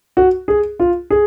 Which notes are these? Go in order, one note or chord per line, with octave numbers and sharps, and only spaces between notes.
F#4
G#4
F4
G#4